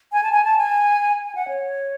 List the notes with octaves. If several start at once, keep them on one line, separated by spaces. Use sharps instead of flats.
G#5
A5
G#5
A5
G#5
G#5
F#5
C#5